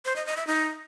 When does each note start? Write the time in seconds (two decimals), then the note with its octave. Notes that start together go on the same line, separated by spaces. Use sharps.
0.05 C5
0.16 D#5
0.26 D#5
0.37 E5
0.47 D#4